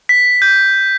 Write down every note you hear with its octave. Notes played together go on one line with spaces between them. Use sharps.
B6
G6